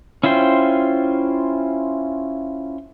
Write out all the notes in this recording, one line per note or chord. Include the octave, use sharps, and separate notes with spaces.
C#4 E4 F4 C5 G5